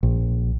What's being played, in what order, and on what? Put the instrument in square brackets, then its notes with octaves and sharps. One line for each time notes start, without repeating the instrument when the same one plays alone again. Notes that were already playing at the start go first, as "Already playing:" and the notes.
[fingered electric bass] A#1